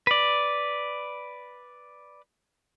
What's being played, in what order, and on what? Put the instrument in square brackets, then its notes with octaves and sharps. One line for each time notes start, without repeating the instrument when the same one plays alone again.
[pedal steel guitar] B4 D5